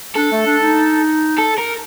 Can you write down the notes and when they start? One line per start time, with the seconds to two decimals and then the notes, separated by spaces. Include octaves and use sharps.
0.16 D4 A4
0.32 A3
0.46 D4
0.62 D#4
1.38 A4
1.58 A#4